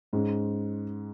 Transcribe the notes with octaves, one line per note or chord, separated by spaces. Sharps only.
G#2 G#3 C#4